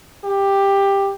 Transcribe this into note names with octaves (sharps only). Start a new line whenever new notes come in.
G4